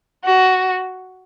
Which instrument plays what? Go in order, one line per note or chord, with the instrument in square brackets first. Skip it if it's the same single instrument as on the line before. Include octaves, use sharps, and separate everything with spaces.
[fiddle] F#4